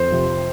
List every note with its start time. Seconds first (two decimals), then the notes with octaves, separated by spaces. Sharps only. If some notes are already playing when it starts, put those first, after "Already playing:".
Already playing: F2 C5
0.12 C3 F3